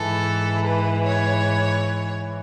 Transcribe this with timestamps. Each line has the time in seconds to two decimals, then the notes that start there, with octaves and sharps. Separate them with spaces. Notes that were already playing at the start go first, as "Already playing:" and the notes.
Already playing: G#2 E3 A4
0.66 B4
1.05 C#5